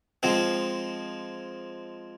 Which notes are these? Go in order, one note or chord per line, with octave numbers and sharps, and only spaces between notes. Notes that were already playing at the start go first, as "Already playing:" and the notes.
F3 G#3 C4